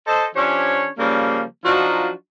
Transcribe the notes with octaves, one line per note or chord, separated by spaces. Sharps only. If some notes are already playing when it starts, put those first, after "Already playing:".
A4 C5 D#5
F3 C#4 D4 G4 C#5
C#3 F3 G3 A#3
F3 F#3 D4 D#4 F4 F#4